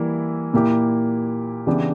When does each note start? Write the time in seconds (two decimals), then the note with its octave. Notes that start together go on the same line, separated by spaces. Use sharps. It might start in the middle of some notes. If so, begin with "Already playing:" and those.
Already playing: E3 G3 A#3 E4
0.53 A#2 A#3 E4 G4
1.67 C#3 E3 B3 D4 G4